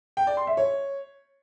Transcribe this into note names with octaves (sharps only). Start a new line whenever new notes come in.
G5
D5
C6
E5
C#5